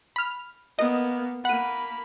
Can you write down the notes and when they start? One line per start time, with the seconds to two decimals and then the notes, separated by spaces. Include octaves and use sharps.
0.16 B5 F6
0.79 A#3 B3 D#5
1.45 A#3 F#5 B5 D#7